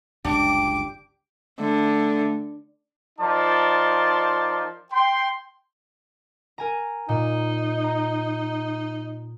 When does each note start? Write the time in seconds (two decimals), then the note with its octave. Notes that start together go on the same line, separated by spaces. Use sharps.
0.25 G1 C#2 F#2 D4 G4 D6
1.59 D3 A3
3.19 F3 D#4 A#4 D5 A5 C6
4.92 G5 C6
6.58 A#4 G#5 A#5
7.09 A#2 D#4
7.84 A#5